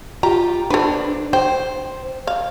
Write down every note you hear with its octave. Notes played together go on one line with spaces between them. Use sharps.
F4 G4 A#5
D4 A4 B4 C5
C5 G5
F5